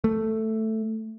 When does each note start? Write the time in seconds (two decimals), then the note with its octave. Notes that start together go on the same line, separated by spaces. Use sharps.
0.04 A3